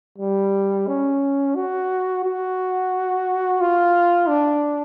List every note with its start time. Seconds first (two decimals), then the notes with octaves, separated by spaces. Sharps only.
0.18 G3
0.88 C#4
1.56 F#4
2.24 F#4
3.61 F4
4.28 D4